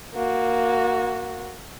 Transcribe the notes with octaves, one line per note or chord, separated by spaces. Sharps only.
A#3 F#4